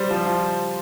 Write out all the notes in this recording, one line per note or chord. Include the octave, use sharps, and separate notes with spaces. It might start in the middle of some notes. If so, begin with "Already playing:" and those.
Already playing: G3 C5
F3
F3